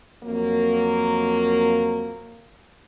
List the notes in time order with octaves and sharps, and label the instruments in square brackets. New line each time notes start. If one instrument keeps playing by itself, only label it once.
[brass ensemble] F2 F#3 A#3